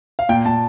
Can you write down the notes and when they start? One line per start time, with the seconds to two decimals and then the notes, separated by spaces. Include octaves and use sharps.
0.19 F5
0.29 A#2 G5
0.45 A#2 A5